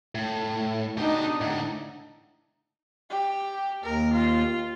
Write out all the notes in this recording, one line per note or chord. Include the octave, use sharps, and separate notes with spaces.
A2
B2 D4 D#4 G4 D#5
A2 D3 D#4
G4
D#2 A#4
F4